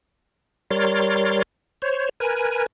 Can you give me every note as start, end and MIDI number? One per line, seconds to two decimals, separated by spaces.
0.71 1.42 55
0.71 1.42 70
0.71 1.42 73
0.71 1.42 84
0.71 1.42 93
1.82 2.09 72
1.82 2.09 73
2.20 2.66 70
2.20 2.66 71
2.20 2.66 80